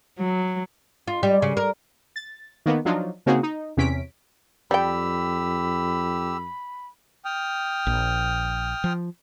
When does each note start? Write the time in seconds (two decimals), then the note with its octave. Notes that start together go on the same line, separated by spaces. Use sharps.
0.19 F#3
1.07 F4
1.23 G3
1.42 C#3
1.57 A#4
2.16 A6
2.66 D#3 A#3 B3
2.85 F3 F#3 D4 D#4 F4
3.26 C#3 A#3 C4 D#4 F#4 G#4
3.43 D#4
3.77 E2 C3 C#4 B6 D7
4.71 F2 G3 G4 G5 B5 E6
7.25 G5 D#6 F6
7.87 A#1
8.84 F3